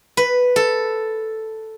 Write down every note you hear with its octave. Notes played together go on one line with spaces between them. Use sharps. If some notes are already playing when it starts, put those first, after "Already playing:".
B4
A4